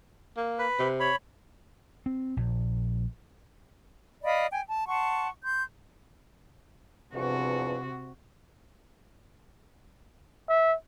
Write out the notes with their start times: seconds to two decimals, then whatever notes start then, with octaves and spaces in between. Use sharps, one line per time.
0.37 A#3
0.59 B4
0.79 C3
1.00 C#5 B5
2.06 C4
2.37 A#1
4.24 D5 D#5 F5 B5
4.51 G5 G#5
4.67 A5
4.87 F#5 A5 C6 C#6
5.44 C6 G6
7.13 E2 G2 C3 F3 F#4
10.49 E5